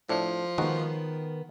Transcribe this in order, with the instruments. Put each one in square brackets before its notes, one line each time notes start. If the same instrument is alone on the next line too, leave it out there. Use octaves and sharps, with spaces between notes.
[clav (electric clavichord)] A2 D4 [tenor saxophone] F3
[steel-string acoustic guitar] D#3 B3 [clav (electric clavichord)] G#3 D#4 F#4